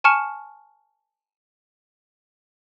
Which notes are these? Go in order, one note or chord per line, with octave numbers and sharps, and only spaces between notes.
G#5 A5 C#6 F6 C#7 E7